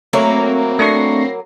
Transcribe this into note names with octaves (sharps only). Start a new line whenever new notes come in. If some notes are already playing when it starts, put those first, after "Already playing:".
F#3 A3 A#3 C4 E4 C#5
A3 D4 C#6 A#6 C7